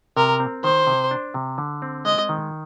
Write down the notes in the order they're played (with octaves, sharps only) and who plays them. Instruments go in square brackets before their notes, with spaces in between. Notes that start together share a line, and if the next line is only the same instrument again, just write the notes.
[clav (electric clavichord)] C3 [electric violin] A#4
[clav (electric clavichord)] C4
[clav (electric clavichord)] D#3 [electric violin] C5
[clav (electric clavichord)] C3
D4
C3
D3
C4
[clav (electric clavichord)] G#3 [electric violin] D#5
[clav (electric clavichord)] D#3